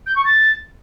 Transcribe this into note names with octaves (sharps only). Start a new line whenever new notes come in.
G6
C#6
A6